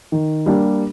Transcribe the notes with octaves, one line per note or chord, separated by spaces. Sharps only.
D#3
G3 A#3 D4 G4